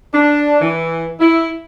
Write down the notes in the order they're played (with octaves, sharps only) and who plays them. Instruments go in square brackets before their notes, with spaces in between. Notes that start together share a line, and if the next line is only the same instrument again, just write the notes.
[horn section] D4
E3
E4